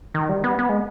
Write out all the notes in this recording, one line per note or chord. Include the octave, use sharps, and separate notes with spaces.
D#3
G3
B3
B3
G#3